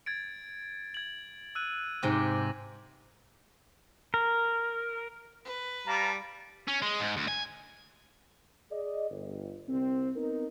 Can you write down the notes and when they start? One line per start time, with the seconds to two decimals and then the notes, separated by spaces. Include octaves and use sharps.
0.06 G#6 A6 D7
0.94 G#6 F#7
1.55 E6 F#6 D#7
2.03 G#2 C3 G4 D6 A#6
4.14 A#4
5.45 B4
5.87 G3 F5 A5 A#5
6.68 C#4
6.82 G#3
7.00 G#2
7.17 D2
7.28 G#5
8.70 G#4 D5 D#5
9.10 G1
9.67 C2 C4
10.15 B3 C4 D#4 A#4